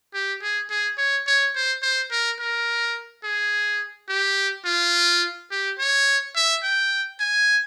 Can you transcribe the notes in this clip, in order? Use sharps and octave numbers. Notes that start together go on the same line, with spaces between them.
G4
G#4
G#4
C#5
C#5
C5
C5
A#4
A#4
G#4
G4
F4
G4
C#5
E5
G5
G#5